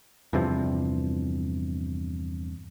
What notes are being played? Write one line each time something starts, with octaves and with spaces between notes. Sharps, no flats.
E2 G2 C3 F3